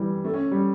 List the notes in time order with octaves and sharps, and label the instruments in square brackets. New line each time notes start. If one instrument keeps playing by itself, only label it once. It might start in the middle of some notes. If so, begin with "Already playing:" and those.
Already playing: [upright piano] E3 G3
A3
C#4
G3